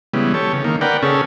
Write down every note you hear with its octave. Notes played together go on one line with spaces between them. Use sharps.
C#3 E3 G3 G#3 B3
G4 A4 C#5
C#3
D#3 A#3
A#4 B4 D5 F#5 G5
C#3 C#4 G#4 A4